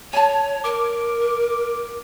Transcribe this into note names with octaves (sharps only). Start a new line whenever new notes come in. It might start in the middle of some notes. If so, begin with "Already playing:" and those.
C#5 G#5 A5
A#4 D6